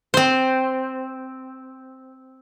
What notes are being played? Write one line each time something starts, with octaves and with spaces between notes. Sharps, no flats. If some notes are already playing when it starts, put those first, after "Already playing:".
C4 C5